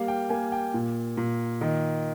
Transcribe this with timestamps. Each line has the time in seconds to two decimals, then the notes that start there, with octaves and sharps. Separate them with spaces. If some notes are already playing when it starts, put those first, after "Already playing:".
Already playing: G3 A#3 F5
0.08 G5
0.29 A#3 G#5
0.52 G5
0.74 A#2
1.17 A#2
1.61 D#3